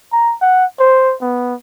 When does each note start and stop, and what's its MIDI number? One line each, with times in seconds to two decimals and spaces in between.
0.12 0.34 82
0.41 0.65 78
0.79 1.14 72
1.21 1.54 59